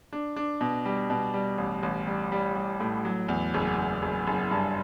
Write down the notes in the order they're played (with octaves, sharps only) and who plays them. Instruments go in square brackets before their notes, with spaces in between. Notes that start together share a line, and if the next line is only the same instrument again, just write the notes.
[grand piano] D4
D4
B2
G3
B2
G3
A1
A1
G3
G3
G3
A2
F#3
E2
F#1
F#1
F#1
F#1
G2